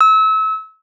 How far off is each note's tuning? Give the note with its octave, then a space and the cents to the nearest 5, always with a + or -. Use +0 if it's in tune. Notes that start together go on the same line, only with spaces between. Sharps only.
E6 -30